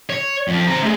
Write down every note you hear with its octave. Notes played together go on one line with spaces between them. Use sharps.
C#5
F2
C4 A#5
A3 G#4